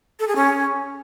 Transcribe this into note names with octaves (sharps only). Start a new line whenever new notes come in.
A4
G#4
C#4